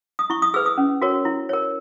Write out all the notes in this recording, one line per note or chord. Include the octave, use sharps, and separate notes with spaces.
D#6
E4 C#6
D#6
G#4 B4 E6
D#6
C#4
F#4 A#4 C#5
E4
A#4 C#5